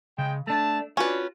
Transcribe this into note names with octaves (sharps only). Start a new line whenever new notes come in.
C#3 G#3 G5
A3 D4 A5
C#4 D4 F4 F#4 B4